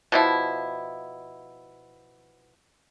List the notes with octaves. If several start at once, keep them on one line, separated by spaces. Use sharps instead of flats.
B2 F3 E4